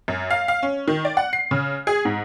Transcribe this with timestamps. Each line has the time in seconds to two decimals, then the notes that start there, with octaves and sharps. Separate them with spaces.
0.08 F#2
0.31 F5
0.48 F5
0.63 C#4
0.88 D#3
1.05 D5
1.17 F#5
1.33 C7
1.51 C#3
1.87 G#4
2.05 G#2